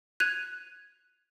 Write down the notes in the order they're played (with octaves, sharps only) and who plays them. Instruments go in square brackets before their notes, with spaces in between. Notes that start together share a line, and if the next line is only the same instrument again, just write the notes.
[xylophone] F#6 G#6 D#7 F7